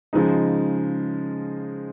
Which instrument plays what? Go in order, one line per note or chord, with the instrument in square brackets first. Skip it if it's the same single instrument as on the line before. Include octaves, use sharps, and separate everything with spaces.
[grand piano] C#3 F3 G#3 D#4